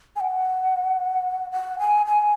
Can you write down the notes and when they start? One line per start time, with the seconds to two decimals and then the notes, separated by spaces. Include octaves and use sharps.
0.16 G#5
0.20 F#5
1.52 F#5
1.79 G#5
2.06 G#5